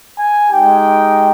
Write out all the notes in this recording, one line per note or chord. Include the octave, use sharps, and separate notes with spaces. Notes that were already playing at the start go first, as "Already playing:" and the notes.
G#5
G#3 D#4 G4 G5